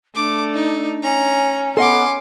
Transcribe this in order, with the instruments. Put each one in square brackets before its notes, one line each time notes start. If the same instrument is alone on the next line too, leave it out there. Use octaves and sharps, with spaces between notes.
[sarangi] A3 [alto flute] D4 [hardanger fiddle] D6
[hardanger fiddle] D#4
[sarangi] C#4 [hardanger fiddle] A#5
[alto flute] B3 [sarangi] C#4 [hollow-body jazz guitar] A4 D#5 F#5 [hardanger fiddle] C6 D6